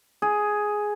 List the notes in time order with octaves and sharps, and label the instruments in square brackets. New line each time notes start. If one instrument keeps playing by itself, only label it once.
[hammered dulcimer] G#4